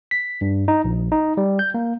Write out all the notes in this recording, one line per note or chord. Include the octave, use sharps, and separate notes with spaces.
B6
G2
D#4
A#1
D#4
G3
G6
A#3